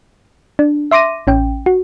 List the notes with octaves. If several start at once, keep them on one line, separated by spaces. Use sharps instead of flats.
D4
E5 C6 D6 A#6 D#7
A1 C#4 G5
F#4